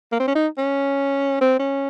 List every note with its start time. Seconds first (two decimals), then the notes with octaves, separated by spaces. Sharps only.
0.12 A#3
0.20 C4
0.27 C#4
0.35 D#4
0.58 C#4
1.41 C4
1.59 C#4